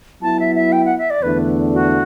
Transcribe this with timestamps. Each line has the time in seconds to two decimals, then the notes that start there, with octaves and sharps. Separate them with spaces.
0.22 F#3 B3 E4 A5
0.40 E5
0.55 E5
0.72 G5
0.85 F#5
0.98 E5
1.10 D5
1.23 E2 D3 A3 D4 B4
1.73 F#4